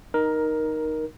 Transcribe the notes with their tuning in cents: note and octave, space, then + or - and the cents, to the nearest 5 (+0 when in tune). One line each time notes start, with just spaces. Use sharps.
D#4 -5 A#4 +10